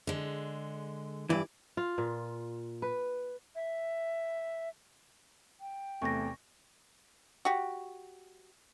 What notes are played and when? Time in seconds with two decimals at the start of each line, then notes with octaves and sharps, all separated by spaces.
0.07 D3 G#3
1.30 G2 E3 D5
1.77 F4
1.98 A#2
2.82 B4
3.55 E5
5.61 G5
6.02 E2 C3 A3 C#6 A#6
7.45 F#4 G4